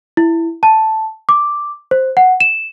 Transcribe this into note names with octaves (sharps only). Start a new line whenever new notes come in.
E4
A5
D6
C5
F#5
E7